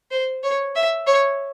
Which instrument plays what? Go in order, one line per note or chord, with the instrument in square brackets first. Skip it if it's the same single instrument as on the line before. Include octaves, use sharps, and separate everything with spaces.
[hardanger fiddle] C5
C#5
E5
C#5